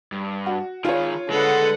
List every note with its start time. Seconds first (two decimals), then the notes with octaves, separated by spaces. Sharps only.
0.12 G2
0.46 F#4
0.85 D#3 F4 G#4 C#5
1.30 D3 G#3 A4 B4 F#5